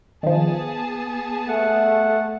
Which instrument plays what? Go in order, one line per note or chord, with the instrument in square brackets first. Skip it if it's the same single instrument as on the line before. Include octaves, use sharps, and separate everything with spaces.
[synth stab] D#3 F3 [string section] B3 G#4 A5
[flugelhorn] A3 [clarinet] F#5